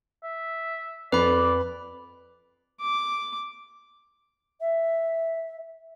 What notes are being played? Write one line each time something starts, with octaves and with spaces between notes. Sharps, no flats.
E5
F2 B4 D5 B5
D6
E5